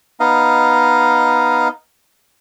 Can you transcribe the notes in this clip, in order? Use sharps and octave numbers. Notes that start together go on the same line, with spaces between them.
B3 D#4 D#5 F5